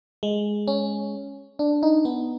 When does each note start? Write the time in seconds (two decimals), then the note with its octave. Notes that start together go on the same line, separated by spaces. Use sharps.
0.23 G#3
0.68 C#4
1.59 D4
1.83 D#4
2.05 B3